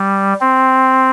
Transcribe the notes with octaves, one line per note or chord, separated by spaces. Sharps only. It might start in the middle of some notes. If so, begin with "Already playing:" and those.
Already playing: G3
C4